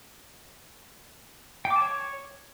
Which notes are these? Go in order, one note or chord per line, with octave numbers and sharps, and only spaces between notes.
G5
D6
A5
C#5